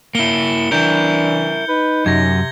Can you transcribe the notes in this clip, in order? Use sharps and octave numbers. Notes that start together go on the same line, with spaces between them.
A#3 E4 C#7 G7
E3 D4 E4 A#4 G6 G7
D#4 B4
F#2 C3 G#6 A#6